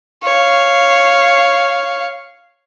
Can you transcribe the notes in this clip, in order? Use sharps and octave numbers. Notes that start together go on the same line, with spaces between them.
C#5 F5